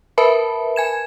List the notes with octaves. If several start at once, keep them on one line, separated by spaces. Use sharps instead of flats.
A#4 B4 E5 A5 B5
G#5 G#6 E7